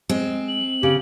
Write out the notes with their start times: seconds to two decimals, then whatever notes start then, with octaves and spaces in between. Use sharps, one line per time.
0.09 G#3 C4
0.48 F#7
0.83 C#3 G4